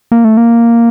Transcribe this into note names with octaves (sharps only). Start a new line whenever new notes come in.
A#3
A3
A#3